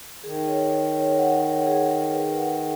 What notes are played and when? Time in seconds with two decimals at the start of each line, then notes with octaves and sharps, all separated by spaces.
0.23 D#3 G#4
0.48 C#5
0.71 C#5
0.94 C#5
1.18 F#5
1.42 C#5
1.66 G#4
1.90 G#4
2.13 B4
2.37 F#5